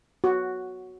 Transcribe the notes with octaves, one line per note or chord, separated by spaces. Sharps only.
F#4